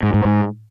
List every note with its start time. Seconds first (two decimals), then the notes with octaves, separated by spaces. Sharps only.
0.03 G#2
0.14 G#2
0.25 G#2